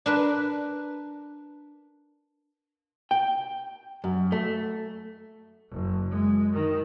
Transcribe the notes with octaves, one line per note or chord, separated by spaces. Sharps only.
D4 A#4 B4
G5
F#2
A3
F#1
F#2 G#3
D#3